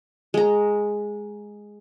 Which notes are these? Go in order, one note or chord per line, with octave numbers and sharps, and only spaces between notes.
G#3 A#5